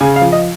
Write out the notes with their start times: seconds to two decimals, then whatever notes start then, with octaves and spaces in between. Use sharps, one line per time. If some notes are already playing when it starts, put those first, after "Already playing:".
0.01 C#3 G#5
0.16 F5
0.22 F3
0.32 D#5